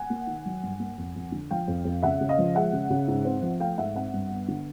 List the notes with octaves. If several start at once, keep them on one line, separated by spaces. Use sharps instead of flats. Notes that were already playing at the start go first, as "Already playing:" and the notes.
Already playing: F#5 G#5
A#3
D#3
F#3
G2
A#3
F2
F2
D3
F3 F5 G5
F2
F2
C#3 E5 F#5
C#3
D#5 F5
F3
G#3 E5 F#5
C#3
C#3
G#2
C4
F3
A3 F5 G5
G#2 E5 F#5
C4 E5 F#5
G2
B3
D3